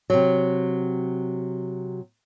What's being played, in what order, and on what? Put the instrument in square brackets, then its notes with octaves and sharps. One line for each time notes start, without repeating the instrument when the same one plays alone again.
[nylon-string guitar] C3 F#3